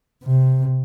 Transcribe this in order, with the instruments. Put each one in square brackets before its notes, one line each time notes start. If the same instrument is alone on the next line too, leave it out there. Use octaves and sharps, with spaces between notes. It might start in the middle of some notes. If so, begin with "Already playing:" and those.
[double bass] C3